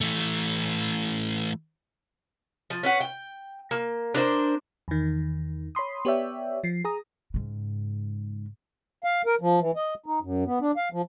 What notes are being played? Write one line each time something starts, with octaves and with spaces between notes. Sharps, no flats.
E3 A3
F3
C#4 B4 F#5
G5
A#3
D4 A#4 C5
E2 D#3
C#5 B5 C6 D#6
B3 G4 C#5 D5 E5 G5
F3 C7
G#4 A#5 D#6
G#2 C#3
F5
A#4
F3
E3
D#5
D#4
F#2
B3
D4
F5
F3